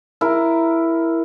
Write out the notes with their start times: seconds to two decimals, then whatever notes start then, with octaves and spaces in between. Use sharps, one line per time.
0.21 E4 A#4